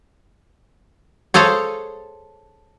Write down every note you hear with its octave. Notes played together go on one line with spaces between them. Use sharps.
G#4 A4 C5 C#5 F5